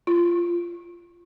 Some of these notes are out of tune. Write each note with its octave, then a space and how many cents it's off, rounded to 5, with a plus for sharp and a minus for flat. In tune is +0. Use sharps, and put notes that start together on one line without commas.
F4 -15